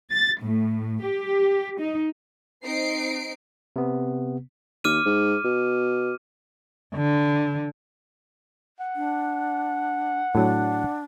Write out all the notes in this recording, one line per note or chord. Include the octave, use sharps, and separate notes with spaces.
A6
A2
G4
D#4
C4 D#4 C7 D7
C3 B3
D#2 D6 F6 D#7
G#2
B2
D3
F#5
D4
A2 F#3 D4